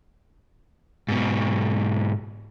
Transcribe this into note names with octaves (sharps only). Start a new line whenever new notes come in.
G#2 B2